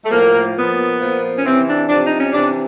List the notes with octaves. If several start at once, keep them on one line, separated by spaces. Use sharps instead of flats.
A3
A2 F3 A#3
A#2 F3 B3
A#2 F3
C#4
C3 E3 C4
D4
C3 F3 D4
D#4
C#4
C3 E3 D4